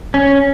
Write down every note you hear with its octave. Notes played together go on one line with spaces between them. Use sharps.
C#4